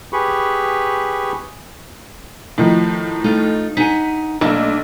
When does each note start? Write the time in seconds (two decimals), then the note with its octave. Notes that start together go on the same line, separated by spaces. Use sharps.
0.13 G4 G#4 B4 B5 C#6
2.58 A2 D#3 F3
3.24 A3 D#4 F4
3.77 D#4 F#5 G#5 B6
4.41 B1 A3 A#3 D4